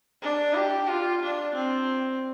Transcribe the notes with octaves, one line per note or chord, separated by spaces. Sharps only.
D4
G4
F4
D4
C4